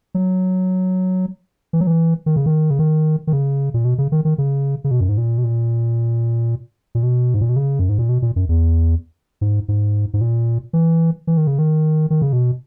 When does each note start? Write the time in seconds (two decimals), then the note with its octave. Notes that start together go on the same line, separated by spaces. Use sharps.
0.14 F#3
1.73 E3
1.81 F#3
1.87 E3
2.26 D#3
2.36 C#3
2.46 D#3
2.70 C#3
2.79 D#3
3.27 D#3
3.32 C#3
3.74 A#2
3.85 B2
3.98 C#3
4.12 D#3
4.25 D#3
4.38 C#3
4.84 C#3
4.91 B2
5.00 F#2
5.09 G#2
5.18 A#2
5.38 B2
5.44 A#2
6.95 A#2
7.03 B2
7.34 G#2
7.41 A#2
7.49 B2
7.56 C#3
7.79 F#2
7.89 G#2
7.98 A#2
8.09 B2
8.22 A#2
8.36 F#2
8.49 E2
9.41 G#2
9.68 G#2
10.14 G#2
10.21 A#2
10.73 E3
11.27 E3
11.37 D#3
11.47 C#3
11.59 D#3
12.10 D#3
12.22 C#3
12.33 B2